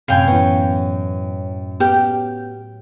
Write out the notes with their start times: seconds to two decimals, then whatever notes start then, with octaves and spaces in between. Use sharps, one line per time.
0.08 F#2 A2 C3 F5 G5 G#5
0.28 E3 B3 C#5
1.80 B3 G4 G5 F6